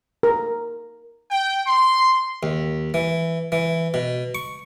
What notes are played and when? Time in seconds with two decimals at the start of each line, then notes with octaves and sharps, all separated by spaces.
0.23 A#4
1.30 G5
1.67 C6
2.43 D#2
2.94 E3
3.52 E3
3.94 B2
4.35 C#6